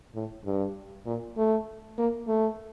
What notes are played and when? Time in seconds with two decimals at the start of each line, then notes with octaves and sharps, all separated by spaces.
0.15 A2
0.45 G2
1.06 A#2
1.37 A3
1.98 A#3
2.28 A3